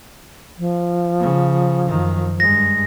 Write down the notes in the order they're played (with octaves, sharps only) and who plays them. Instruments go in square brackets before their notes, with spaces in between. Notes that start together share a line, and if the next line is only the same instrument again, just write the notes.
[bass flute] F3
[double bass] C#3
F#2 D#3
[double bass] G2 G#3 [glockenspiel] A#6